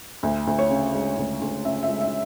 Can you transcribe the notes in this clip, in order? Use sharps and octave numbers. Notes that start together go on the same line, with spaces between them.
D2
D2
C#5
C#3
G#3
D2
D2
C#3 E5
E5
G#3
E5